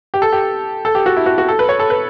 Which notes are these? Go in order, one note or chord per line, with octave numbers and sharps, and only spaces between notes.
G4
A4
G4
A4
G4
F#4
E4
F#4
F#4
A4
B4
C#5
A4
B4